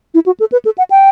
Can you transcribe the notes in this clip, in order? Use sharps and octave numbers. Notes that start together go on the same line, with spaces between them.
E4
F#4
A4
B4
A4
F#5
G5